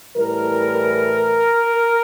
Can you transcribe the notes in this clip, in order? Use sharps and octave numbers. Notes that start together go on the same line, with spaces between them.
A2 E3 G3 A#4